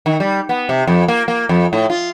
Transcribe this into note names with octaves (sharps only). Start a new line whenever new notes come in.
D#3
G3
B3
C3
F2
A#3
A#3
F2
A2
F4